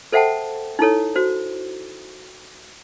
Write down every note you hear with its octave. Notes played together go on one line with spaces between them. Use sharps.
A4 C5 E5 F#5 G5 A5
D#4 E4 A4 C#5
F#4 C5